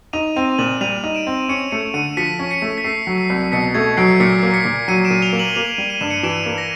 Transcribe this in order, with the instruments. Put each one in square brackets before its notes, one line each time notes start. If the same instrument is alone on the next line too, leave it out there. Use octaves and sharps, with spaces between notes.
[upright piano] D#4 [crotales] D#7 F7
[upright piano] C4 [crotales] D#7 F7
[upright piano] A#2 [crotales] E7 F#7
[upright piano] G3 [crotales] D#7 F7
[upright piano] D#4
[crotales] D7 E7
[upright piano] C4
[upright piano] C#4 [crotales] C#7 D#7
[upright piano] A3 [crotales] C#7 D#7
[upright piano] D3 [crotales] C#7 D#7
[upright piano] F3 [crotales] B6 C#7
[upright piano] C#4
[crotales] B6 C#7
[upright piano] A3
[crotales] B6
[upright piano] A3 [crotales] C7
[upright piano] F#3
[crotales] C7
[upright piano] C2
[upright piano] B2 [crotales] B6 C#7
[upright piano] A3 [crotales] G#6
[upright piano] F#3 [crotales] C7 D7
[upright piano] A#2 [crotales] B6 C#7
[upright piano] A#3
[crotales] B6 C#7
[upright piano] A#2
[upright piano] F#3 [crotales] C#7 D#7
[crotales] D7 E7
[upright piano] A#2
[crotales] F7 G7
[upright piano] A#3
[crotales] E7 F#7
[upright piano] A#3 [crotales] D#7 F7
[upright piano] G3
[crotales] D#7
[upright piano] G2 [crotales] E7
[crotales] C#7 D#7
[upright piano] E3 [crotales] D7 E7
[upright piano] A#3
[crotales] A#6